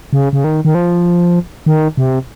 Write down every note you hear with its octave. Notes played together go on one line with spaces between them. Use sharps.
C#3
C#3
D#3
D#3
F3
D#3
C3